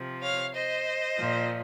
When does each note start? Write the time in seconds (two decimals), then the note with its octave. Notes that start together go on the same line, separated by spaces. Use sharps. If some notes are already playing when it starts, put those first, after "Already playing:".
Already playing: C3 F3
0.22 C#5 F5
0.54 C5 D#5
1.17 A#2 F3